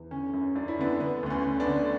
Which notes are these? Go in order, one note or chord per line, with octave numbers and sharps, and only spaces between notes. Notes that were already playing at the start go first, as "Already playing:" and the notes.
Already playing: E2
D3 C#4
F#2
F#2 D4
E4
D3 B3 D4
D3 B3
D2 B3
C#4
D2
B3 D4
D3